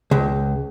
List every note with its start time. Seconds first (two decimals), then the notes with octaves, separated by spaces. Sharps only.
0.11 C#2